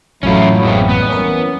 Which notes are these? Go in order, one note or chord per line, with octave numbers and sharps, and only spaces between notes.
A1 F#2 F#3 A3 C#4 E4 F4
E2 G#3 B3 C4 E4
D#2 G3 B3
E3 C#4 A#4